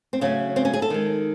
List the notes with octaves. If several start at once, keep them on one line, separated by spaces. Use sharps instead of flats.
C4
C#3 F#3 A3 C#4
C4
C#4
G#4
A4
D#3 G#3